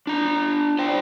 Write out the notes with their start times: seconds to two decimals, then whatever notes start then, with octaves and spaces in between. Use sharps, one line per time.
0.07 D4 A#5
0.79 C5 D5 G5